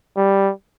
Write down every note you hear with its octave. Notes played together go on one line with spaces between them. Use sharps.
G3